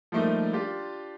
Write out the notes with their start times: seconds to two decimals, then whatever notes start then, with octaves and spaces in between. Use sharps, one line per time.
0.12 F3 G3 A3 A#3 D#4
0.53 D4 F4 G4